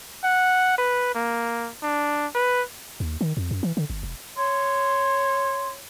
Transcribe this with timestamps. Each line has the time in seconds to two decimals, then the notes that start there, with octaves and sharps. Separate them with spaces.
0.24 F#5
0.78 B4
1.15 A#3
1.83 D4
2.35 B4
3.00 D#2
3.21 D#3
3.37 F2
3.51 F#2
3.63 E3
3.77 D3
3.90 G1
4.03 E1
4.37 C#5 C6